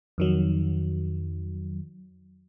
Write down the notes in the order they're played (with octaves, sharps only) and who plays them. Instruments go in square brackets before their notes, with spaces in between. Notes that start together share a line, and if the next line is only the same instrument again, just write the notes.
[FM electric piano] F2 D#3 F#3